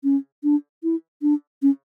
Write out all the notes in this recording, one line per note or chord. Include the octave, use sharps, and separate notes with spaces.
C#4
D4
E4
D4
C#4